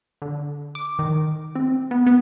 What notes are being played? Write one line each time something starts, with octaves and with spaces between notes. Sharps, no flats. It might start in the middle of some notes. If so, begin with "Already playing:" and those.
D3
D6
D#3
C4
B3
B3